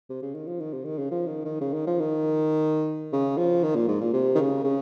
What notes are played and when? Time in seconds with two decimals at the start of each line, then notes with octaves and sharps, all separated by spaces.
0.10 C3
0.22 C#3
0.35 D#3
0.47 F3
0.60 D#3
0.73 C3
0.85 D#3
0.99 C#3
1.11 F3
1.27 D#3
1.45 D#3
1.61 C#3
1.74 D#3
1.87 F3
2.00 D#3
3.13 C#3
3.37 F3
3.63 D#3
3.76 A#2
3.88 G#2
4.01 A#2
4.13 C3
4.35 D#3
4.39 C#3
4.64 C#3